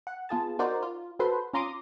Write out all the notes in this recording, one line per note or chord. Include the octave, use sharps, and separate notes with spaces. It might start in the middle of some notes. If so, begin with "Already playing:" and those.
F#5
B3 F4 G#4 A5
D#4 F#4 A#4 C5 D5
F4
F#4 A4 B4 C5 C6
C#4 F4 A#5 C6 D6 D#6